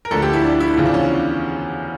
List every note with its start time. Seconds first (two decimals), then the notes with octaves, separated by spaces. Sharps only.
0.05 A#4
0.11 D2 D3 F3 A4
0.22 G4
0.33 E4
0.44 D4
0.60 E4
0.77 E2 C#3 F3 F4
0.86 D4
0.94 C#4